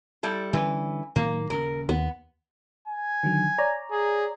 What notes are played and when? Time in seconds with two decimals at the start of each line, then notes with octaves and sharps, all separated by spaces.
0.23 G3 E4 A4
0.53 D3 E3 G3 C#4 B4
1.16 A2 D#3 F#3 A#3
1.50 D#1 C#3 A#4
1.89 D#2 B3
2.88 G#5
3.23 D3 D#3 F#3
3.58 C#5 D5 A#5
3.91 G#4